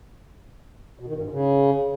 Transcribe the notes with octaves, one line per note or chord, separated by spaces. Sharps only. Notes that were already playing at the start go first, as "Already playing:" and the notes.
B2
D#3
G2
G#2
C#3